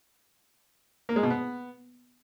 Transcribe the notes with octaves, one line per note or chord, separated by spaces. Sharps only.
A#3
G#3
B2
B3